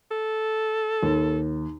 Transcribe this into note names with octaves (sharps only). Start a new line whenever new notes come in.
A4
D#2